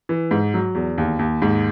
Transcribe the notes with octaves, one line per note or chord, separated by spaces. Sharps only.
E3
G#2
F#3
E2
D#2
D#2
G#2